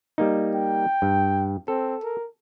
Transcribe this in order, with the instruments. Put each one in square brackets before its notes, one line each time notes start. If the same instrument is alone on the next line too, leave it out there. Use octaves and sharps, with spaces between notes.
[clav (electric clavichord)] G3 A#3 D#4
[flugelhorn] G5
[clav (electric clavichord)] G2
[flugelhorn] C4 [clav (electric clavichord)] A4
[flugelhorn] A#4